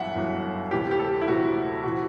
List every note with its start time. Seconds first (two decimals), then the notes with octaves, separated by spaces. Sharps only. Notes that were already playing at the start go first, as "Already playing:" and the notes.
Already playing: G1 F#2 E3 E5 F#5
0.15 G1 F#2 E3
0.71 D2 C3 E3 G4
0.91 G4
0.99 A4
1.21 E4
1.28 D2 C3 E3 F#4
1.83 C3 E3 F#4